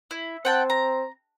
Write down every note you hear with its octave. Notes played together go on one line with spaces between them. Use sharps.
E4
C4 F#5 G5 A5
A#5